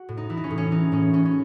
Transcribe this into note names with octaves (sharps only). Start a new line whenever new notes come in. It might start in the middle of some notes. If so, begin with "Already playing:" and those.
Already playing: F#4
A2
D#4
E3 E4
D#4
C#4
A2
C#4
E3 D#4
A2 C#4
E3 C#4
C#4